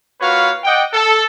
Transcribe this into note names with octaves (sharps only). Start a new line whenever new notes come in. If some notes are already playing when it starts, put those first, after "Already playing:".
A#3 F4 F#4 B4 C#5 F5
D5 D#5 F#5 G5
A4